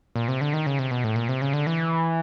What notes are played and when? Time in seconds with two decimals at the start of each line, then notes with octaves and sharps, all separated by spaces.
0.16 A#2
0.28 C3
0.41 D3
0.53 D#3
0.66 C#3
0.79 C3
0.91 B2
1.04 A2
1.16 A#2
1.29 C3
1.42 C#3
1.53 D3
1.67 E3